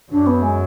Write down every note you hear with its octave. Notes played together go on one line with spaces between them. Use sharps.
F#2 D4
B3
G#3